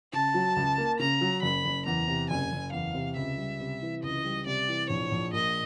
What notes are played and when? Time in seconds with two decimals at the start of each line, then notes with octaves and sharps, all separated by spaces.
0.13 C#3 A5
0.34 F#3
0.56 C#2
0.78 A#3
0.99 C#3 A#5
1.21 F#3
1.42 F#1 B5
1.65 F#1
1.86 E2 A#5
2.08 C3
2.30 F#1 G#5
2.52 F#1
2.72 E2 F5
2.94 C3
3.16 C#2 E5
3.37 G3
3.60 C3
3.82 E3
4.03 C#2 D#5
4.25 G3
4.46 C3 D5
4.68 E3
4.90 A#1 C#5
5.12 A#1
5.33 A#2 D#5